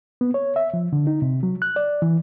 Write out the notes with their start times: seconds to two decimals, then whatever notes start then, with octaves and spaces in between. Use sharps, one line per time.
0.21 B3
0.34 C#5
0.56 E5
0.74 F3
0.93 D3
1.07 D#4
1.22 C3
1.43 F#3
1.62 F#6
1.76 D5
2.02 E3